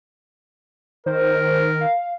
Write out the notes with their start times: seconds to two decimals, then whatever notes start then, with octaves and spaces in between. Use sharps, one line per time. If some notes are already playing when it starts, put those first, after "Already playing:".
1.06 D#3 A#4 C5
1.81 F5